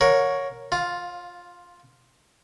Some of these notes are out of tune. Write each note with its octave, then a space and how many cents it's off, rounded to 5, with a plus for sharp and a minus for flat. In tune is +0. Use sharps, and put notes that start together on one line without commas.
A#4 +0 C#5 +0 F#5 -35
F4 +0 F5 +25